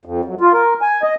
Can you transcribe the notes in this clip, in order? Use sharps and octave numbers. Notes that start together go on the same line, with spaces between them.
F2
F#2
F4
A#4
G#5
D#5